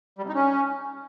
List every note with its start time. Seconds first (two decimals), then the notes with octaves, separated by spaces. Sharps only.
0.18 G3
0.24 C3
0.29 D#4
0.34 C#4